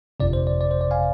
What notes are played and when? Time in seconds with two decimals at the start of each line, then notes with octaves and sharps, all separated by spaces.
0.20 G1 F2 C3 D5
0.33 C5
0.47 D5
0.61 D5
0.71 C5
0.81 D5
0.91 F5 G#5